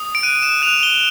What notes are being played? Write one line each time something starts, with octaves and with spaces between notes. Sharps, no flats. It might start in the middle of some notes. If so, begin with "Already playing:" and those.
Already playing: D#6
D7
F#6 D#7
E7
F#6 F7
G7